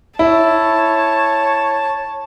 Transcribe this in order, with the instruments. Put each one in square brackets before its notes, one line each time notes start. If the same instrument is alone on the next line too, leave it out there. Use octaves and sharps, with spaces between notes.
[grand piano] E4 [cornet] C#5 [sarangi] A5